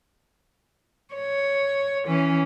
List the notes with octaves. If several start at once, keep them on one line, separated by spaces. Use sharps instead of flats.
C#5
E3 C#4